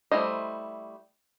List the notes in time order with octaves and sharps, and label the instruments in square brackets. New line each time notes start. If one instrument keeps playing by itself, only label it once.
[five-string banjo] G3 A3 E4 C5 D#5